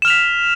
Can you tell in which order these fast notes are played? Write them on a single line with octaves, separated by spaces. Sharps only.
E7 F6 F7 B6